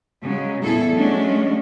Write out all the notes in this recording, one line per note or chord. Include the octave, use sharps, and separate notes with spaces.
C#3 F#3 G#3
E2 A#2 E4 G#4 A4
F#3 G#3 A3 C#4 D4